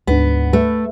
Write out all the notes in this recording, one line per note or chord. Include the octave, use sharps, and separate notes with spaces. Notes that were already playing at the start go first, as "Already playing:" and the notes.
D2 G#2 B3 D4
A3 B4